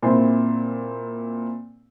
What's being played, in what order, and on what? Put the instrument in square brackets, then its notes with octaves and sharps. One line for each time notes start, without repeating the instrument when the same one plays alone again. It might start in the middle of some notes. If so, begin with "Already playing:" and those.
[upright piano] A#2 C4 E4 C6